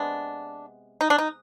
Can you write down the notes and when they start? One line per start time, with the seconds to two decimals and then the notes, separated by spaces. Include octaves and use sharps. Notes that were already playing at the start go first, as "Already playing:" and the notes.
Already playing: C3 G#3 B3 D4
1.01 D#4
1.10 D4
1.18 D#4